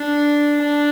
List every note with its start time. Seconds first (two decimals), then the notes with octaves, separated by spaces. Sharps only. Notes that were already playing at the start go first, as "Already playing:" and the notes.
Already playing: D4
0.61 D4